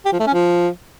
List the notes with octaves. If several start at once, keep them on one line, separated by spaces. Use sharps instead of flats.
G4
F3
A3
C#4
F3